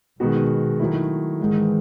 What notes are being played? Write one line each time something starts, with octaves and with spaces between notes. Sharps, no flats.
B2 D#3 G#3 B3 F#4
D#3 F#3 A3 E4
G#2 D#3 E3 G#3